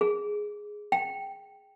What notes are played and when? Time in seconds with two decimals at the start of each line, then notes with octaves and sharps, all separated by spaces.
0.01 G#4
0.92 G5